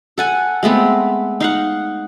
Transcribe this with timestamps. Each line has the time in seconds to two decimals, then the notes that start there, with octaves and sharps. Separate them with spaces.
0.18 A4 F#5 G#5
0.63 G#3 A3 B3 C4
1.40 D#4 F5 F#5